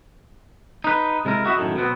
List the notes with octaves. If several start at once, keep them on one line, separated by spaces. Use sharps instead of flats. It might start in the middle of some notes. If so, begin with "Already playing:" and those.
D#4 B4
C3 G#3 E4 A#4
E4 F#4 D#5 E5
F#2 A2 D#3
B2 F#3 B3 C4